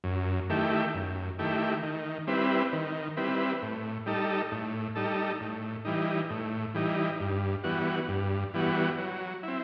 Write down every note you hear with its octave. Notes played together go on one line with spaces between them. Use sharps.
F#2
D#3 A3 E4 G4
F#2
D#3 A3 E4 G4
D#3
G3 C4 E4 B4
D#3
G3 C4 E4 B4
A2
G3 D#4 A4
A2
G3 D#4 A4
A2
E3 G3 D#4
A2
E3 G3 D#4
G2
E3 G3 B3 F#4
G2
E3 G3 B3 F#4
F#3
C4 E4